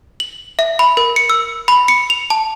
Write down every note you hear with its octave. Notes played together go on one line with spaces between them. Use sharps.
F#7
E5
B5
A#4
C#7
E6
B5
C#7
F7
A5